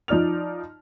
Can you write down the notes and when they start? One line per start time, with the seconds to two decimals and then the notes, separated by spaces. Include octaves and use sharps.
0.08 F3 D#4 D5 F6 F7